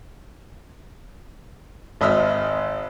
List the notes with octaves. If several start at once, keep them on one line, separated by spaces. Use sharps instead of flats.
G#1 D#5 E5 E6 F6